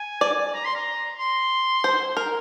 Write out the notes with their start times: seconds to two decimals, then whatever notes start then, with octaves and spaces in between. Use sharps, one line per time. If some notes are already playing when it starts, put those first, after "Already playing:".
Already playing: G#5
0.21 D5
0.54 A#5
0.64 C6
0.75 A#5
1.19 C6
1.84 C5
2.17 A#4